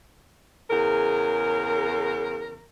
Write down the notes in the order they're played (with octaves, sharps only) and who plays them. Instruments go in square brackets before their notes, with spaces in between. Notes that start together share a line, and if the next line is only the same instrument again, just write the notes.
[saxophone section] E2 C#3 A#4